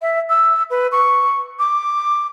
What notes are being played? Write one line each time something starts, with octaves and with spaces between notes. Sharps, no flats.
E5
E6
B4
C#6
D6